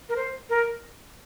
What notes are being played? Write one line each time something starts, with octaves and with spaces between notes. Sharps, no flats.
A#4
C5
A#4